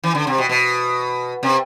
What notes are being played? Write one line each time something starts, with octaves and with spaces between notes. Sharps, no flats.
E3
D3
C3
B2
B2
C3